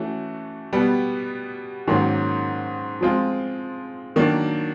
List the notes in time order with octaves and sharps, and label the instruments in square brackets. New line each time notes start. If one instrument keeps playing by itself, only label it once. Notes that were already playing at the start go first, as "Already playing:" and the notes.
Already playing: [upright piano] E3 A3 C#4 F#4
B2 G3 B3
G#2 D#3 F#3 A#3 C#4
F3 G#3 C4 F4
D#3 F#3 A#3 D4